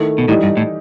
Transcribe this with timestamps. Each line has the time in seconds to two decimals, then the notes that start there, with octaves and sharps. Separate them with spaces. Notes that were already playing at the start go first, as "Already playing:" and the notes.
Already playing: D#3 A3 E4 A4
0.18 B2
0.28 A2 E3 G3 D#4
0.43 G2
0.57 A2